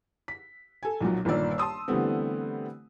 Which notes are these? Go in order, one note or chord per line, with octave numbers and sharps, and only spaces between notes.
B6
A4 G#5
B1 A#2 F3 F#3
G1 A#2 D#3 A#3 D5 E6
A5 C6 D#6 E6
D3 E3 G3 A3 B3 C4